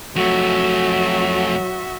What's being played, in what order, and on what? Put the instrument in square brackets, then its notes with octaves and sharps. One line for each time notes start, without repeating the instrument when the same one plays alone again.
[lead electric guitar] F2 A3 [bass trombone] F#3 [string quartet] F#4 E5